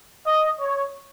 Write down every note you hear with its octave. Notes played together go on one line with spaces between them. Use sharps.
D#5
C#5